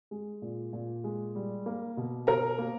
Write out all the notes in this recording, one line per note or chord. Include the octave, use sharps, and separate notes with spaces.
G#3
A#2
A#2
G#3
G3
A#3
B2
B2 A#4 A#5
A#3